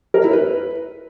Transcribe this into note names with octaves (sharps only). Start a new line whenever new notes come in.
A#4
E4
B4